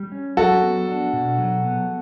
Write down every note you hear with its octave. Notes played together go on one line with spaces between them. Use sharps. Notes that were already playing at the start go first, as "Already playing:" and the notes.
Already playing: G3
C#4
F#3 F#4 A4
B3
D4
B2
F#3
B3